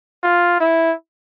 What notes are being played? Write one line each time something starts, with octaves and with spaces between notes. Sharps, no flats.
F4
E4